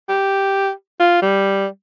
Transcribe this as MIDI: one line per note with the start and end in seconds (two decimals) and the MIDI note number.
0.09 0.71 67
1.00 1.20 65
1.22 1.66 55